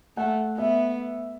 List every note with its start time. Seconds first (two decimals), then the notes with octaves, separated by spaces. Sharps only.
0.17 A3 F#5
0.58 B3 E5